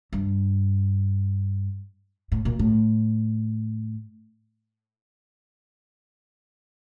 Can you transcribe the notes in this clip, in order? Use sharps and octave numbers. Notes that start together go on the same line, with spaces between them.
G2
A2
A#2
A2